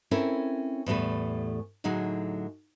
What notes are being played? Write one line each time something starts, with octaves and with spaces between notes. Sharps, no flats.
C4 C#4 E4 A4 A#4 C#5
E2 A2 G3 A3 B4
A2 D3 F#3 D#4 G#4